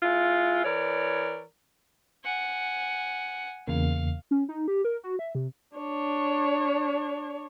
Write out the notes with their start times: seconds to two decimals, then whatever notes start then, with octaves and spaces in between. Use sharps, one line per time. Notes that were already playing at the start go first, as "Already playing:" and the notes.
0.03 G#3 E4 F4
0.65 E3 A#4 C#5 D5
2.24 F#5 G#5
3.67 E2 C#3 A#3 F5
4.31 C#4
4.49 D#4
4.68 G4
4.85 A#4
5.03 F#4
5.19 E5
5.35 C3
5.77 D4 C#5